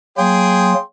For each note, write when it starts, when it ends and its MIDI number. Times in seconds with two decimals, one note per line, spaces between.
0.18 0.74 54
0.18 0.74 58
0.18 0.80 68
0.18 0.80 79
0.18 0.80 84